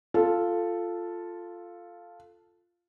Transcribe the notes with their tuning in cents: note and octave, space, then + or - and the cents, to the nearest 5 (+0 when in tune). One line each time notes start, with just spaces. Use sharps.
F4 +0 A4 +0